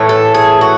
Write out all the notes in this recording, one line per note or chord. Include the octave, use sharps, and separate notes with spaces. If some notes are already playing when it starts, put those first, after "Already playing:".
Already playing: A2 E3 A3
A4
G#4
F#4